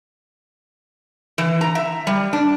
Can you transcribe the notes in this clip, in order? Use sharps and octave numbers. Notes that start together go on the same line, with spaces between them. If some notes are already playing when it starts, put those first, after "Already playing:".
E3
A#5
E5
G3
D4